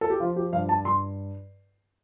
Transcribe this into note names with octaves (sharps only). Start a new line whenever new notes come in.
A4
G4
F3 F4
G4
G2 F5
A5
G2 C6